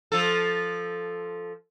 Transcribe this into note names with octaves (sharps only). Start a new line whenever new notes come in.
F3 A4